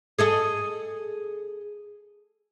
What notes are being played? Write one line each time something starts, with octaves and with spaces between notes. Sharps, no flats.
G#4 A4 D#5